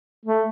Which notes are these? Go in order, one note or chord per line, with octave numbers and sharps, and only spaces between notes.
A3